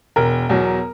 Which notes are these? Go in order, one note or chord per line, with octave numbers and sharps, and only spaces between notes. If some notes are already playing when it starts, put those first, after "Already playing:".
E1 A#4
E2 B2 F#3